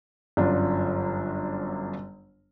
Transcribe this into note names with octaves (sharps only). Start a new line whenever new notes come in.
G1 F#2 D3 D4 F4